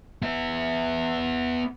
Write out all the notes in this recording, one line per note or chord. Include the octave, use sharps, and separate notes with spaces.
B3 E5